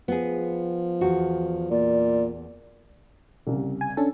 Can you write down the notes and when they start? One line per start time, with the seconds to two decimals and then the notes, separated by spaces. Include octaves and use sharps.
0.08 F3 B3 G#4
1.01 E2 F#4
1.71 A#2 D5
3.47 C2 C#3 G3
3.81 G#5
3.97 C#4 D4 A4